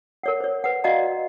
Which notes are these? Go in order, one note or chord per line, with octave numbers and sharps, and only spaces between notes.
A#4 C#5 F#5
C5 C#5
B4 F#5
F#4 D5 D#5 F5 F#5 A#5